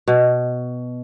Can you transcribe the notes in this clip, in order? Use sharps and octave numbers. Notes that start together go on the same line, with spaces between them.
B2